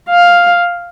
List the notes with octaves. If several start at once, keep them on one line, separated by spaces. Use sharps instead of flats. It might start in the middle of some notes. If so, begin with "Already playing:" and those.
F5